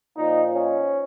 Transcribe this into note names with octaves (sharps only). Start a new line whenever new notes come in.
A#2 F3 D#4
C#4